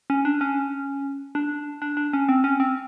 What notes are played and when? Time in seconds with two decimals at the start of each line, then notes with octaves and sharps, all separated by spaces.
0.10 C#4
0.25 D4
0.41 C#4
1.35 D4
1.82 D4
1.97 D4
2.13 C#4
2.29 C4
2.44 C#4
2.60 C4